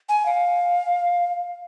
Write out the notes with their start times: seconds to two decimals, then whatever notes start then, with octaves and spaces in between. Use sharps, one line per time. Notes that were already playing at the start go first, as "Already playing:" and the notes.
0.09 G#5
0.26 F5